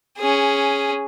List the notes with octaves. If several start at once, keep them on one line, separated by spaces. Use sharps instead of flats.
C#4 G#4